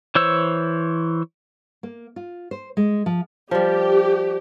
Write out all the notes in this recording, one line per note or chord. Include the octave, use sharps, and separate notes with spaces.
E3 C5 C#5 E6
A#3
F4
C5
G#3
F3
F3 G3 G4